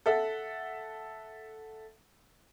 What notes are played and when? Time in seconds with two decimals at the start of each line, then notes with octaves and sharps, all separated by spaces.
0.06 A4 E5 F#5